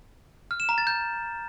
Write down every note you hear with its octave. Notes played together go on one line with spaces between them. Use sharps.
F6
E7
A#5
A6
G6